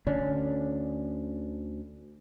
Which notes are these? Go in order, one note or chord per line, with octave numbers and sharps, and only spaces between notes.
D2 D3 C#4 D4